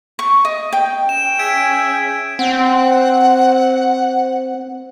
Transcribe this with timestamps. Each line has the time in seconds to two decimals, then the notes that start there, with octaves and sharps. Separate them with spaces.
0.19 C#6
0.45 D#5
0.73 G5
1.09 C#4 G5 E7
1.39 G#4 E5 G#6 D7
2.39 C4 F#5